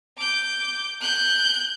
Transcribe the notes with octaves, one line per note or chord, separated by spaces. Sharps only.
D6 G6
F#6 G6